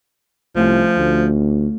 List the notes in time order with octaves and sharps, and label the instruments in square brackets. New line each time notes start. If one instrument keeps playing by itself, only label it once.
[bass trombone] C2 [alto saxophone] F3 [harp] A3 C#4 F4
[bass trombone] D2